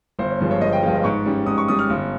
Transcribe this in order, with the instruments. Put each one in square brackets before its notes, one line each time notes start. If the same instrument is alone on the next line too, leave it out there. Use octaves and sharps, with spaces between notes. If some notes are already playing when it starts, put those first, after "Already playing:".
[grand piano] G1 C5
C#5
G2 F3 G#3
C#5
G1 D#5
G5
G2 F3 G#3 F5
G#2 C#6
G3 C#4
G#2 D#6
C#6
G3 C#4 D#6
F6
G1